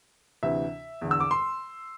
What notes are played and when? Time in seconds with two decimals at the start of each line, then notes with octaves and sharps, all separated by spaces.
0.43 D2 C3 E3 E5
1.01 E2 D3
1.11 E6
1.20 D6
1.31 C6